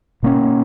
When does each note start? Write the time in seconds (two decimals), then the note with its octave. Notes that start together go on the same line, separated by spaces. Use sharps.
0.23 B2 A#3 C#4